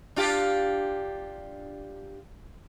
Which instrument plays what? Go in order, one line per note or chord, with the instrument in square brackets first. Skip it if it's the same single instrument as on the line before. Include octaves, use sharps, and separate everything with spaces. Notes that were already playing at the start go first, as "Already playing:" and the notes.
[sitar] D4 F4 G4